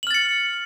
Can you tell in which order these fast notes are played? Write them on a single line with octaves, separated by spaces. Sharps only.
F#7 F6 A6 C#7